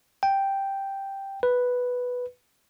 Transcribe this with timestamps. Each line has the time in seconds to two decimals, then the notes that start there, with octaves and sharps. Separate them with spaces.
0.23 G5
1.43 B4